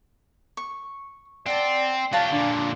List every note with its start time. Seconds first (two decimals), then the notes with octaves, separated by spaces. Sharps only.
0.57 C#6
1.46 C4 D5 F#5 A5
2.13 F#3 F4 G4 F5 A5
2.32 A#2 D3 D4